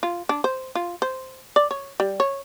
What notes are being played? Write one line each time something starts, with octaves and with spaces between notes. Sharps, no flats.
F4
D4
C5
F4
C5
D5
C#5
G3
C#5